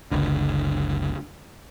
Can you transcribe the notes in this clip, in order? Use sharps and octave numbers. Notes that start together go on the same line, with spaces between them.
F#1 C#2 D3